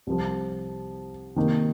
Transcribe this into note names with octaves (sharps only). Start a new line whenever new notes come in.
C2 C3 F3
C3 D#3 A#3 D#4 A#4